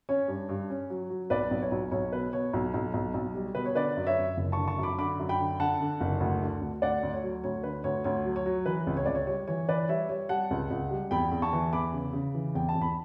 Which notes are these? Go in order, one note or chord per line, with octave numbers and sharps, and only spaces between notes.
C#4 C#5
G2
G2
C#4
F#3
F#3
B1 B4 D5
B1
C#5
B1
B1 C#5
B2 B4
B2 C#5
B1
B1
B1
B1
G3
B2 B4
C#5
D3 B4 D5
F#2
C#5 E5
F#2
F#1
D3 A5 C#6
A5 C#6
F#2
B5 D6
D3 B5 D6
F#2
G5 B5
D3
D3 F#5 A5
D3
F#1
D2
D3
D2
D2 D5 F#5
D2
C#5
F#3
D2 C#5
D3 B4
D2 C#5
D2 C#5
F#3
C#5
F#3
E3 B4
C#2
C#5
C#2 D5
C#5
G3 C#5
E3 C#5
E3 B4 D5
G3 C#5 E5
G3 C#5
G3 F#5 A5
C#2
C#2
G3
E2 G5 B5
E2
A5 C#6
E3
E2 B5 D6
C#3
C#3
E3
E2 G5
A5
E2
B5